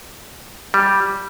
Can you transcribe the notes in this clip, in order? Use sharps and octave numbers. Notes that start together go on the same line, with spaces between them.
G3